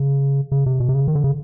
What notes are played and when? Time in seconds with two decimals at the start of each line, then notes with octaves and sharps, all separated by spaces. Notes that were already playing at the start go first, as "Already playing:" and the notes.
Already playing: C#3
0.52 C#3
0.66 C3
0.80 B2
0.89 C3
0.94 C#3
1.08 D#3
1.15 D3
1.24 C#3